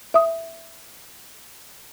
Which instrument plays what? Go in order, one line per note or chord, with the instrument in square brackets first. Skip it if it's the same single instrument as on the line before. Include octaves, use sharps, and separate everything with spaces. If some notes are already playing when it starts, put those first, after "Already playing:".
[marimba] E5 D#6